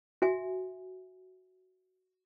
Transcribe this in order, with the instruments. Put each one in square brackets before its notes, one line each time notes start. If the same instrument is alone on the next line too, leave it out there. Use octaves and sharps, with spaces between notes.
[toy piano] F#4 E5 G#5